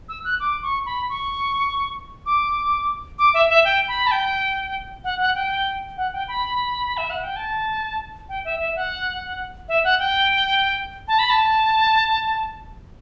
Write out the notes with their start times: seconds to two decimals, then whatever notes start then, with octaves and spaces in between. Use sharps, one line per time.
0.09 E6
0.24 F#6
0.40 D6
0.63 C#6
0.86 B5
1.10 C#6
2.26 D6
3.18 D6
3.34 E5
3.49 E5
3.65 G5
3.88 B5
4.07 A5
4.11 G5
5.04 F#5
5.20 F#5
5.35 G5
5.97 F#5
6.13 G5
6.28 B5
6.97 E5
7.10 F#5
7.24 G5
7.36 A5
8.29 G5
8.45 E5
8.60 E5
8.76 F#5
9.68 E5
9.84 F#5
9.99 G5
11.08 A5
11.19 B5
11.30 A5